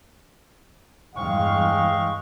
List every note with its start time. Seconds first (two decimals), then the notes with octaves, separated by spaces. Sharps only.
1.15 E2 G2 G#3 F5 G5 C#6